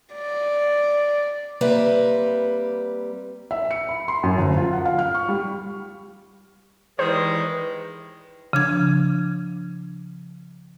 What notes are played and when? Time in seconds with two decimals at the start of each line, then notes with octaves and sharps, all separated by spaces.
0.14 D5
1.61 G3 A#3 C4 B4 E5
3.51 E5
3.71 C#7
3.89 B5
4.08 C6
4.23 F#2
4.38 D2
4.57 F4
4.73 F#5
4.85 F5
4.99 F6
5.14 C#6
5.28 G3
6.99 D#3 E3 G3 G#3 B4 C5
8.53 C#3 F3 D4 G#6